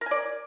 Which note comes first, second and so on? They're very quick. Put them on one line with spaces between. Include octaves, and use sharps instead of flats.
A#4 G#5 D5